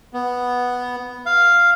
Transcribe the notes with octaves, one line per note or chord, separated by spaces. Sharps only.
B3
F5